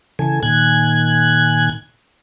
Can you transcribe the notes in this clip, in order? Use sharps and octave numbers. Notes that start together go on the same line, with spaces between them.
C#3 E3 A4 G#5
A#2 D#3 G#5 F#6 G#6